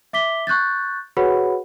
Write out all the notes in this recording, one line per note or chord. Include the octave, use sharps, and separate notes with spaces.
E5 D6 B6 G7
C#6 F#6 G6 A6
F#4 G#4 B4 C#5 F#5 B5